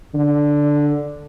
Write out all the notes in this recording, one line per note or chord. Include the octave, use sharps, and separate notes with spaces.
D3